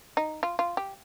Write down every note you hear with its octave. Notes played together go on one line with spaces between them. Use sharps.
D#4
F4
F4
G4